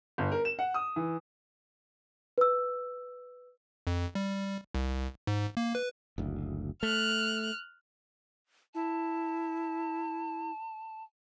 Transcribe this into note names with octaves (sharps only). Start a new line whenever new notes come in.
G1
A#4
E7
F#5
D#6
E3
B4 E6
F2
G3
C2
G#2
A#3
B4
F#1 D2
A3 F6 F#6
E4 A5